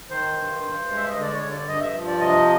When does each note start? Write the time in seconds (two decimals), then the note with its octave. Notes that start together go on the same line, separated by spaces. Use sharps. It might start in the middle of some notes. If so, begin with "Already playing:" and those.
0.10 D#3 C5
0.37 G2
0.63 G2
0.89 G#3
0.97 E5
1.09 D#5
1.16 D3
1.21 D5
1.33 C#5
1.42 G2
1.50 D5
1.68 G2 D#5
1.81 E5
1.94 F3
2.07 D5
2.20 C3 D#5